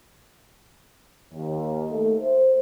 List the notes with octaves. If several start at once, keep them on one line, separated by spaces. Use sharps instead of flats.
D#2
A3
C5